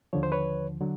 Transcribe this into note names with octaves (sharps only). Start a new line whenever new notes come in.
D#2 D3 F3 C#5
C5
B4 C#5
D3 F#3